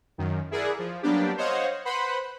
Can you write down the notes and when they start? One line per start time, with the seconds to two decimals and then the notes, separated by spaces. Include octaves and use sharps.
0.18 F#2 D#3
0.51 E4 G#4 A#4 D5 F#5
0.79 F3
1.03 F#3 G3 A#3 B3 D4 G4
1.37 C5 C#5 D#5 F5 F#5
1.85 B4 C5 F#5 B5